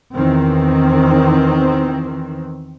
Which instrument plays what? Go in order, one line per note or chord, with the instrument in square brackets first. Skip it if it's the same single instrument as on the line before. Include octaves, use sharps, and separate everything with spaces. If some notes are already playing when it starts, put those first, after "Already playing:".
[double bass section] E2 D#3 E3 C4